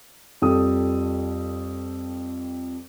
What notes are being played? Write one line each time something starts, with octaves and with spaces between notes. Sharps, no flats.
F2 G3 A4 D#6